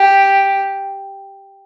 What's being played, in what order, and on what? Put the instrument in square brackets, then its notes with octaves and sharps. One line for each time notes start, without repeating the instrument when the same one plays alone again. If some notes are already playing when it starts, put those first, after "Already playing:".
Already playing: [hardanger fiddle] G4